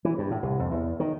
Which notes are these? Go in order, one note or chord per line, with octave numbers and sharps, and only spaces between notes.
E3
G2
A2
C2
F2
E2
D#3